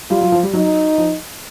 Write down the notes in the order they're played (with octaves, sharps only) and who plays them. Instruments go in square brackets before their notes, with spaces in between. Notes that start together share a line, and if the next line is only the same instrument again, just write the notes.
[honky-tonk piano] G3 [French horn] F4
[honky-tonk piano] F#3
F3
G3
[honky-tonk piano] F#3 [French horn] D#4
[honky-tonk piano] F3